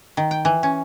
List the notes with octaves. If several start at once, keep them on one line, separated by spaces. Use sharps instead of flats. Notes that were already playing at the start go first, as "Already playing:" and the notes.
D#3
G5
E3
C#4